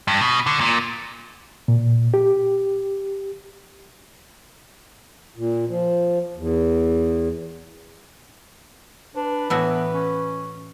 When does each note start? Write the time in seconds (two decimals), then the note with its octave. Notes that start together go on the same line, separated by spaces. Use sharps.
0.08 G2
0.21 B2
0.46 D3
0.61 A#2
1.68 A#2
2.14 G4
5.36 A#2
5.69 F3
6.36 E2
9.16 D4 B4
9.50 A2 E3 B3 F#4
9.93 C#4